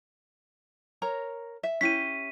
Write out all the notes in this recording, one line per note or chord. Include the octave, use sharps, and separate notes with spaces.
A#4 C#5 A#5
E5
C#4 E4 G4 B6 D#7